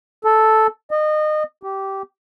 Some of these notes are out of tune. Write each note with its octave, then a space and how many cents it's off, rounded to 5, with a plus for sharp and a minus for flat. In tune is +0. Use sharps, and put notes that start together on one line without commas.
A4 -5
D#5 -25
G4 -15